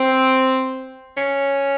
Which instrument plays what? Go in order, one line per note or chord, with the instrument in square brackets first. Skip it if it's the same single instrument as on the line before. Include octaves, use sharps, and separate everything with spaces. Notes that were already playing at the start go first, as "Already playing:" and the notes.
Already playing: [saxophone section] C4
C#4